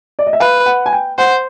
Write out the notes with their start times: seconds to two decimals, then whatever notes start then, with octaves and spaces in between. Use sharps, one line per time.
0.19 D5
0.27 D#5
0.33 E5
0.40 B4 F5
0.66 F#5
0.86 G#5
0.93 G5
1.18 C5 F#5